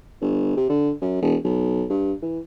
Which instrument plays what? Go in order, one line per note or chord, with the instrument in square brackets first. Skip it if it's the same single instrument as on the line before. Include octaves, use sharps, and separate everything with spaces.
[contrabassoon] G1
C3
D3
F#2
E1
B1
G2
E3